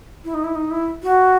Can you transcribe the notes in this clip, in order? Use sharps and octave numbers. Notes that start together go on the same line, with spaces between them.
E4
D#4
E4
D#4
E4
F#4